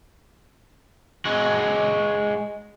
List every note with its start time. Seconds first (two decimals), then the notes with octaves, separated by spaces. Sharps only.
1.25 G#3 F#4